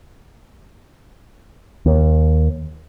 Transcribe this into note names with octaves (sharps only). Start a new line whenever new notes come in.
D#2